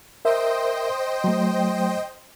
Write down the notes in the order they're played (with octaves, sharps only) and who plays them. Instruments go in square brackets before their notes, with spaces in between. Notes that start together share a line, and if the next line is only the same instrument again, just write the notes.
[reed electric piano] A#4 E5 [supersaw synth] C5 D#5 G5
[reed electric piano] F#3 A3